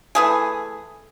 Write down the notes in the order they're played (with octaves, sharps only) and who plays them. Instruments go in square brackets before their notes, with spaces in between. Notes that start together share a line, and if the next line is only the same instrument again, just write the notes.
[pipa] E3 A3 G#4